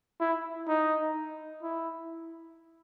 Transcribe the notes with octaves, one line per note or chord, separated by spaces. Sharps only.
E4
D#4
E4